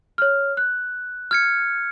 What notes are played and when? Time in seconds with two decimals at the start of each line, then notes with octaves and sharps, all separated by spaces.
0.18 C#5 F6
0.57 F#6
1.31 F6 G#6 C#7